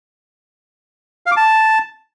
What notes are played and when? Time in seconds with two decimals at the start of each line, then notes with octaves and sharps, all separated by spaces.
1.26 F5
1.31 D6
1.37 A5